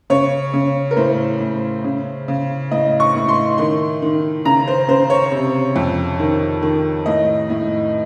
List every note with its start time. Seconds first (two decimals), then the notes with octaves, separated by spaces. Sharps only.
0.10 C#3 C#5
0.53 C#3
0.91 A#4
0.96 A2 C5
1.40 A2
1.84 C#3
2.28 C#3
2.71 A2 D#5
3.00 C#6
3.15 A2
3.29 C6
3.58 D#3 C6
4.02 D#3
4.45 C#3 A#5
4.68 C5
4.88 C#3 C5
5.10 C#5
5.32 C3
5.76 F2
6.19 D#3
6.62 D#3
7.06 A2 D#5
7.50 A2